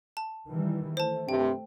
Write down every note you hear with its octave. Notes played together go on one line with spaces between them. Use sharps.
A5
D#3 E3 G3
A3 C5 A5
G2 C3 G5